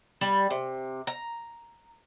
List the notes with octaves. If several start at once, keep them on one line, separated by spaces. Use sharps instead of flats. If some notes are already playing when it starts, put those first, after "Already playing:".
G3
C3
A#5